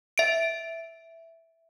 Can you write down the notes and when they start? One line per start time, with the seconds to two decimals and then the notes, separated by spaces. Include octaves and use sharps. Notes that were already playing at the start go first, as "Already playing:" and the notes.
0.18 E5 D7